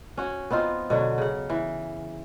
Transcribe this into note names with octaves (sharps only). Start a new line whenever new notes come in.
C#4 F#4
B3 C4 D#4 F4
B2 D3 F#3
C#3 F#5
E3